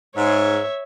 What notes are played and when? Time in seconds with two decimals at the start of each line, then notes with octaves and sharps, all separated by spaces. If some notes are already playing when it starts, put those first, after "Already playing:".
0.17 G#2 C#5 E5